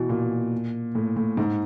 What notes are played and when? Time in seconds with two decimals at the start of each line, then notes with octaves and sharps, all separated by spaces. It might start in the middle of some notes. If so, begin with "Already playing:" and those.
Already playing: B2 E3
0.09 A#2
0.95 A2
1.16 A2
1.37 G#2